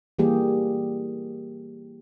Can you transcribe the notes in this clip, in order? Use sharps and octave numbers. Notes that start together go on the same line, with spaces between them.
E3 G3 A#3 G4 G#4